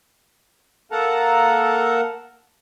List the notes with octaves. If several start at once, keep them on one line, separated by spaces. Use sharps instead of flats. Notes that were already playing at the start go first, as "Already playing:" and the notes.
A#3 A4 A#4 F#5 A5 A#5